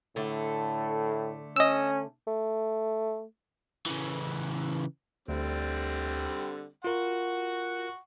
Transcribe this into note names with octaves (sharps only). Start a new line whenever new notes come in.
A2 D3 A3
C#4 D#5 E6
A3
C#3 E3
D2 D3 G3 C4
F4 A#4 F#5 C#6